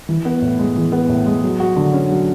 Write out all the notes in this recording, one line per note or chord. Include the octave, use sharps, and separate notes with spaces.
E3
B3
A2
G#3
E3
B3
A2
G#3
F#3
F#4
D3
C#4
F#3